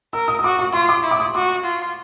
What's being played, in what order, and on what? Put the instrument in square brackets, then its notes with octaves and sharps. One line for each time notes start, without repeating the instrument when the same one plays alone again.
[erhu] A#4 [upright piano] E6
[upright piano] D#6
D#6
[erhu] F#4 [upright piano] D6
[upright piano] C#6
[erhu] F4 [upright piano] C6
[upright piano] D6
[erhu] E4
[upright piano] D6
D#6
[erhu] F#4 [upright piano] D6
[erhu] F4